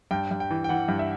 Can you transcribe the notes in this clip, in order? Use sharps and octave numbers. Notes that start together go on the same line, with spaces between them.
G2 G5
G2
G5
E3
G5
E3 F#5
G2
E5